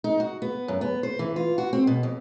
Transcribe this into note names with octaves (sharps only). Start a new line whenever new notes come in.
D#4
F#4
B3
F#2
B3
C5
E3
F4
F#4
C4
B2
F2